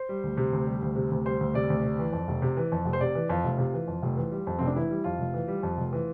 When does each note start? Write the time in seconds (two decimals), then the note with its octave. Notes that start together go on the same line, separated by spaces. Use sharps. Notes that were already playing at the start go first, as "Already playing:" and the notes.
Already playing: C5
0.09 G3
0.23 D2
0.37 C3
0.53 D2
0.67 G3
0.82 D2
0.96 C3
1.11 D2
1.25 G3 C5
1.41 D2
1.54 C3 D5
1.70 D2
1.83 C3
1.99 E3
2.13 F2
2.28 F1
2.42 C3
2.57 E3
2.72 F2
2.85 F1
2.93 C5
3.01 C3 D5
3.15 E3
3.29 F2 F4
3.44 F1
3.58 C3
3.73 E3
3.88 F2
4.03 F1
4.17 E3
4.32 G3
4.47 F2
4.59 F1 C4
4.67 D4
4.76 E3 E4
4.90 G3
5.04 F2 F4
5.19 F1
5.34 E3
5.48 G3
5.63 F2
5.78 F1
5.93 E3